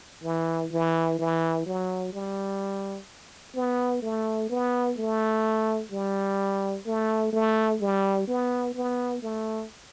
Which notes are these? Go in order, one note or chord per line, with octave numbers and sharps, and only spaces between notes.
E3
E3
E3
F#3
G3
B3
A3
B3
A3
G3
A3
A3
G3
B3
B3
A3